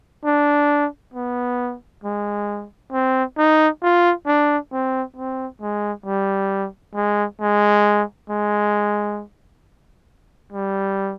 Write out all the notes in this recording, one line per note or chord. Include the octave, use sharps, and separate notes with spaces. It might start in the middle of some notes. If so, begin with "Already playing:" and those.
D4
B3
G#3
C4
D#4
F4
D4
C4
C4
G#3
G3
G#3
G#3
G#3
G3